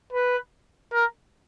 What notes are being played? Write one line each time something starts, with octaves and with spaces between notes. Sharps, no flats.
B4
A#4